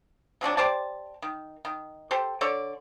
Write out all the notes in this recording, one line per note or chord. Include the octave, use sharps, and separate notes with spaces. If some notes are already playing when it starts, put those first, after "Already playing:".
C3 F3 F#3 D4
G4 C5 D5 A5
D#3
D#3
G4 A4 C5
D3 A4 C#5 D5